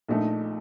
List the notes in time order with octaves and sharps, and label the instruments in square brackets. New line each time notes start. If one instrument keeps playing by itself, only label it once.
[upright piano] A#1 A#2 A3 D#4